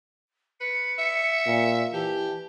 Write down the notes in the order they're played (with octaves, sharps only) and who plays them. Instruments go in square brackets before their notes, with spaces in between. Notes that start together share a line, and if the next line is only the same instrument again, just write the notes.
[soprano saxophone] B4 [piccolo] C#7
[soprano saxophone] E5
[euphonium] A#2
[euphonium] E3 [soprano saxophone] G4 [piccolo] A5